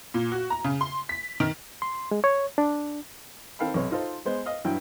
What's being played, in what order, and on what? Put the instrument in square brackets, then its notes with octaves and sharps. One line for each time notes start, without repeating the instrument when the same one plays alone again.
[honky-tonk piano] A#2
F#4
A#5
C#3
C6
B6
D#3
[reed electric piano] C6
G#3
C#5
D4
[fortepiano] D#3 C4 A4 F5 G5 B5
B1 C3 C#5
D#4 F4 A4 C5
G#3 B3 C5
D#5 F5
G2 F#3 E4 G5